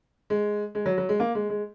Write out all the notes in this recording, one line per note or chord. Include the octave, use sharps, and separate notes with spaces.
G#3
G#3
F#3
F#3
G#3
A#3
G#3
G#3